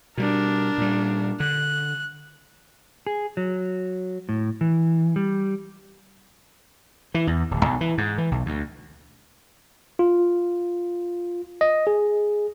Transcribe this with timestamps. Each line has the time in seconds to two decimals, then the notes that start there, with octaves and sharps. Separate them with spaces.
0.18 B2 G3 D4 A#4
0.78 A#2 G3
1.40 D3 F#6
3.07 G#4
3.37 F#3
4.29 A2
4.61 E3
5.16 G3
7.14 E3
7.27 E2
7.51 D1
7.65 B1
7.81 E3
7.98 G#2
8.18 E3
8.31 B1
8.46 D2
9.99 F4
11.61 D#5
11.87 G#4